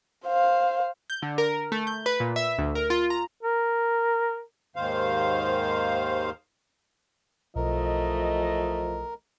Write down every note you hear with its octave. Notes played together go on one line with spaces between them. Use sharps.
C5 F5
G6
D3
A#4
A3
G6
B4
A#2
E5
D2
A#4
F4
A#5
A#4
D#2 G#2 D#3 C5 F5
B1 E3 F3 A3 A#4 D#5